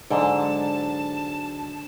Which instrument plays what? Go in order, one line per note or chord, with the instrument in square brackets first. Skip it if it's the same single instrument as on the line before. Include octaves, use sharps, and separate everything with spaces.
[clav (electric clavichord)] G#2 [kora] D3 [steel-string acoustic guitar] F#3 G#3 [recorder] A5